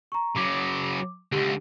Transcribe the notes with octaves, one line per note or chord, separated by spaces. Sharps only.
A#5 C#6
C#3 F#3 D6
C#2 D3 G4